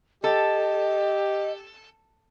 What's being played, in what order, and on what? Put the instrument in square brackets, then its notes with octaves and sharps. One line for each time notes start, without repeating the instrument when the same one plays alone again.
[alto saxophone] G4 [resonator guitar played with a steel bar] A4 [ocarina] D#5